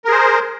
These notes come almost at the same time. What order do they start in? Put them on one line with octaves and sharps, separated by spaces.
A#4 G#4 C5